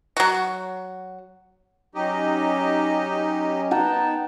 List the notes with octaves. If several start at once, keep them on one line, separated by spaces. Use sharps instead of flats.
F#3 F#4
F#3 C#4 D#4 G4 D#5
B3 D#4 F#5 G5 A5 A#5